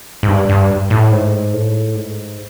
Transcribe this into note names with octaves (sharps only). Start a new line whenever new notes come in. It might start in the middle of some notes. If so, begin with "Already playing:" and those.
G#2
G2
G2
A2
G#2
A2
G#2